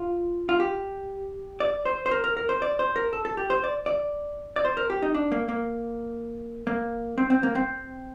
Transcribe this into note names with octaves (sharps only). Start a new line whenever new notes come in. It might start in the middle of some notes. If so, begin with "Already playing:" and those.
Already playing: F4
F4
G4
D5
C5
C5
A#4
A#4
A#4
C5
D5
C5
A#4
A4
A4
G4
C5
D5
D5
D5
C5
A#4
G4
D#4
D4
A#3
A#3
A#3
C4
C4
A#3
C4